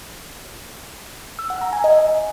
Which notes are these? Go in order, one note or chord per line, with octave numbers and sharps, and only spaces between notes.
E6
F#5
A#5
G#5
D#5